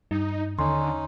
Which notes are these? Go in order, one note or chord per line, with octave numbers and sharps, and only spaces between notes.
G2 D#4
D#2 D3 C#4 D#4 C6